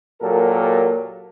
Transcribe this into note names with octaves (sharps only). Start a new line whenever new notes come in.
A#2 F#3 G4 A4 A#4